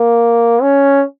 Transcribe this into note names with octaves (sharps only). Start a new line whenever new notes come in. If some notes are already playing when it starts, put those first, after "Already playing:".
Already playing: A#3
C#4